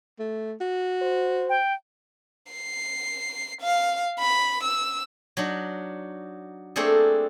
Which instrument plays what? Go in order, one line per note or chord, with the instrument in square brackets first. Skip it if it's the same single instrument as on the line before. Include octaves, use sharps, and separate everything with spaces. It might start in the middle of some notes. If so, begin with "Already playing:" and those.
[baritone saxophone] A3
F#4
[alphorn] C5
[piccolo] G5
[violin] C7
F5
B5
E6
[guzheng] F#3 D4 D#4
A3 A#3 C4 D4 G#4 A4